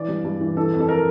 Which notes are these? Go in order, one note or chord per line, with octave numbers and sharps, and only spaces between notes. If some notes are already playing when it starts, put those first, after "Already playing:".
Already playing: E3 D5
G2
G2
E3
E3 A4
F2
A4
A#4